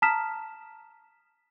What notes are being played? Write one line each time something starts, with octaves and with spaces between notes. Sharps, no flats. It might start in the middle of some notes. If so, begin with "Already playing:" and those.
A5 A#5 D#6 F6 B6 E7